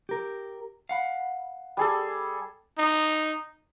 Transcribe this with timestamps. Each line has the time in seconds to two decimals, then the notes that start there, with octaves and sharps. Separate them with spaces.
0.09 G4 A#4
0.89 F5 F#5 B5
1.77 G3 G#4 A4
2.78 D#4